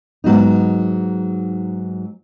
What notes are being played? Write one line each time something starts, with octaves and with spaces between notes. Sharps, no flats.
G#2 F#3 B3 D#4